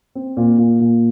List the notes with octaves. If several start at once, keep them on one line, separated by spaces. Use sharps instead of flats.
C4
A#2
A#2
A#2